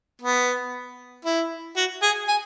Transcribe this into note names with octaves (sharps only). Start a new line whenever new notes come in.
B3
E4
F#4
G#4
G#5